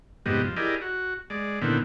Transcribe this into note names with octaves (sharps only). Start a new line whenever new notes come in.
F2 G#2 C3 G3 B3 D#5
F3
E4 G4 G#4 A#4 D5 D#5
F#4
G#3 D5
A#2 D3 D#3 B3 C4 E4